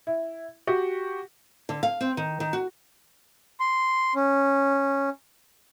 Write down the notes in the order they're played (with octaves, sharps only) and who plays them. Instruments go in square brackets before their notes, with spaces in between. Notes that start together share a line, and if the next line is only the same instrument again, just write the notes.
[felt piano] E4
F#4 G4
[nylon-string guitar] D3
F5
C4
D#3
D#3
F#4
[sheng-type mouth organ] C6
C#4